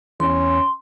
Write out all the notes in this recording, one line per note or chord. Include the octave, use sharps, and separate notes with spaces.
E2 C#4 C6